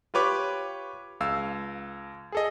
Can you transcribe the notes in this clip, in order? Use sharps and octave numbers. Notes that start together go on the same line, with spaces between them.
F4 G4 B4 C#5 D6
C#2 F5 E6
G#4 A4 D#5